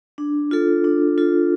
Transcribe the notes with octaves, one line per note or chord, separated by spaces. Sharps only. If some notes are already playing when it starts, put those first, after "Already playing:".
D4
F4 A4
D4
F4 A4